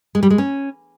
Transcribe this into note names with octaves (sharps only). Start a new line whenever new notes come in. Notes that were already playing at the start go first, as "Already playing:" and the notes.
G#3
G3
G#3
C#4